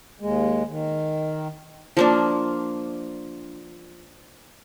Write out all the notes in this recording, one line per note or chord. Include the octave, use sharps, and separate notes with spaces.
D#2 G#3
D#3
F3 A#3 D4